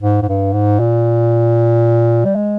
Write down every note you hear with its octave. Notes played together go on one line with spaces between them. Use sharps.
G#2
G#2
G2
G#2
A#2
G3
G#3